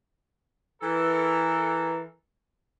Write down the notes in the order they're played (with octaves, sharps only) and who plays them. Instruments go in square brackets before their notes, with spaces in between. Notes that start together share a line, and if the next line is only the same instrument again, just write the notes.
[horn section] E3 A4 A#4